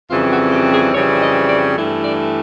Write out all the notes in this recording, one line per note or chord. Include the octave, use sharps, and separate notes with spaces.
F2 C#3 E3 G3 C4 F4
F#4
G4
G#4
F2 C#3 E3 G3 C4 C#5
D#5
D5
G2 E3 A3
D5